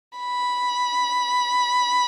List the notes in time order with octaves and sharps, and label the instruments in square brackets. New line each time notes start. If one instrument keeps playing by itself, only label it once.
[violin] B5